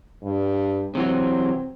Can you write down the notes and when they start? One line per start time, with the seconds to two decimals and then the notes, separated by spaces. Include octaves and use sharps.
0.23 G2
0.95 C3 E3 F#3 C4